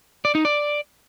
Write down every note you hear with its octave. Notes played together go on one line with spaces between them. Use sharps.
D5
D#4
D5